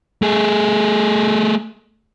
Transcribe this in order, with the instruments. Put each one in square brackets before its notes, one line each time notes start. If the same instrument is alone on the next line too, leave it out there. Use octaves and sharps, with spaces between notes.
[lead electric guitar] A3 G#4